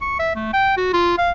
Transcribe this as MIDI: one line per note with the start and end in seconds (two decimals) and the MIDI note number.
0.02 0.16 85
0.19 0.31 76
0.35 0.50 57
0.53 0.76 79
0.77 0.89 66
0.93 1.17 65
1.18 1.31 77